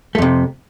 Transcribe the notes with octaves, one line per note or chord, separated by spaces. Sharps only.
F2 C3 A3